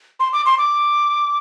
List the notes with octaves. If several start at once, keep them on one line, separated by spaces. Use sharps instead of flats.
C6
D6
C6
D6